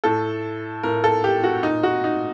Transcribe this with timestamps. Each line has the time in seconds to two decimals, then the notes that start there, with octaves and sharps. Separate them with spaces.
0.04 A2 A4
0.83 A2 A#4
1.04 A4
1.24 G4
1.44 F#4
1.63 A#2 D#4
1.83 F#4
2.04 D#4